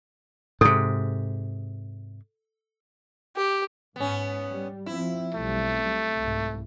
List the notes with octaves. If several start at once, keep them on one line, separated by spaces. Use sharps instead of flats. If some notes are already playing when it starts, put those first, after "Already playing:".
G#2 C3 A4
G4
G#2 B3 C#4
G3
F3 C4 E4
B1 G3 A3 C4
C2 G#2